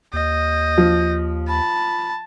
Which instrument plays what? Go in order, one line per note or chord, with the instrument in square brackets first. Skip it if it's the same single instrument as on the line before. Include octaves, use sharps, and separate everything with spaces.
[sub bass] D#2 [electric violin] D#5 [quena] G6
[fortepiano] F3
[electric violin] A5 [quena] B5